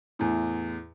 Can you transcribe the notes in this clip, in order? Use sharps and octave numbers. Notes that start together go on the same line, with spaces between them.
E2 A2